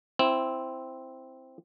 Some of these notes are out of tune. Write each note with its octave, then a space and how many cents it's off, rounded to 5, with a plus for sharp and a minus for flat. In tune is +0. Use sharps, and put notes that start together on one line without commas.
C4 +0 E4 +5